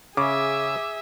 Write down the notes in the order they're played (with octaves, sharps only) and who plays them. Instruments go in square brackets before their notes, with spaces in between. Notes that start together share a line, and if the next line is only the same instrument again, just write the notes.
[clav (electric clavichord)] C#3 [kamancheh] G#4 E5 [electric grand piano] D6